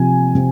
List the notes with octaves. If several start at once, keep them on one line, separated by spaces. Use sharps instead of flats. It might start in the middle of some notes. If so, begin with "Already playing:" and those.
Already playing: C3 F3 G#5
C3